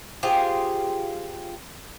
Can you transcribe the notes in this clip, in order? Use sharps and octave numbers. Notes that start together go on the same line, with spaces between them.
F4 G4 G#4 C5